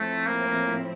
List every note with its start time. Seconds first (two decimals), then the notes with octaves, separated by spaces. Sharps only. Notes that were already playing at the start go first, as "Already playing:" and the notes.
Already playing: A2 F3 A3 C4 E4
0.26 A#3